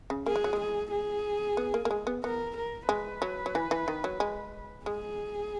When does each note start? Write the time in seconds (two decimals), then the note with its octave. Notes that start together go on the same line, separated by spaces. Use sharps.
0.10 C#3
0.26 A#3 G#4
0.36 G#3
0.44 F#3
0.53 G#3
0.60 G#4
0.91 G#4
1.57 B3
1.74 A#3
1.85 A#3
1.91 G#3
2.07 B3
2.24 B3 A#4
2.57 A#4
2.89 G#3 B4
3.22 F#3
3.46 F#3
3.55 E3
3.71 E3
3.88 D#3
4.04 F#3
4.20 G#3
4.86 G#3 G#4